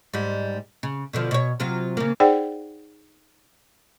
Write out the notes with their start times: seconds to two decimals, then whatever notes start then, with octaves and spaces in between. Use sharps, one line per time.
0.14 G#2 G3
0.83 C#3
1.13 B2 D3 F3
1.31 B2 C#5
1.60 C3 F#3 F4
1.97 C#3 A#3
2.20 D#4 G#4 C5 D5 F#5 G5